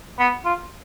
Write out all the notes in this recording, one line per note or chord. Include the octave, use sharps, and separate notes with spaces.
B3
F4